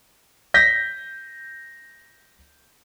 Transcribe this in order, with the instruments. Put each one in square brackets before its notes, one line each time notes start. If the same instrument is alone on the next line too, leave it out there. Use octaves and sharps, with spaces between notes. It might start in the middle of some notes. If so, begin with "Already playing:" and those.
[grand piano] G6 A#6 B6